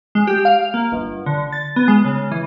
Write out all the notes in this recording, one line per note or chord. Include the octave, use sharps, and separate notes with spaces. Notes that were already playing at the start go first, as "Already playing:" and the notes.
G#3
G4
F5
A#3
G1
D3
A6
B3
G#3
C#3
E3